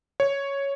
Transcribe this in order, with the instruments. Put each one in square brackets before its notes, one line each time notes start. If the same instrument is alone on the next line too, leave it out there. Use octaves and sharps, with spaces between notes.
[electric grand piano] C#5